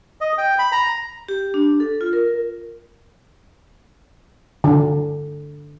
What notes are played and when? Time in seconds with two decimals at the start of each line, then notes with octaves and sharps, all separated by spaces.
0.21 D#5
0.38 G5
0.59 B5
0.72 A#5
1.29 G4
1.54 D4
1.80 A4
2.01 F4
2.13 A#4
4.64 D3